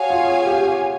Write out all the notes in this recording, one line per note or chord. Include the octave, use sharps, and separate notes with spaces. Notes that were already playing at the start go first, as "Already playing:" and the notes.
Already playing: F#4 G#4 C#5 F5 G#5
F4
G4